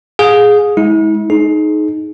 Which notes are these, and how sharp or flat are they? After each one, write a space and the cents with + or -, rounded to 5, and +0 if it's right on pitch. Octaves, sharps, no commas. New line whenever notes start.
G#4 +0 F5 +35
G#3 +25 E4 -45
D#4 +0 G#4 +35